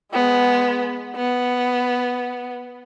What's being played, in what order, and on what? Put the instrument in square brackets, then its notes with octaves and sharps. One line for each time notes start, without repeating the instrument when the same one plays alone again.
[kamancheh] G#3 B3
B3